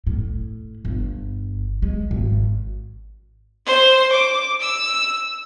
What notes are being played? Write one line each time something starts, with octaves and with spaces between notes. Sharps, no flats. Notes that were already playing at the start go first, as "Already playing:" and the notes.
A2
G1
G#3
G#1
C5
D6
E6